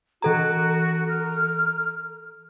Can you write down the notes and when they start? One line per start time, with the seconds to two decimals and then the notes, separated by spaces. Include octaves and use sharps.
0.22 E3 F#4 A4 A#5
1.09 F6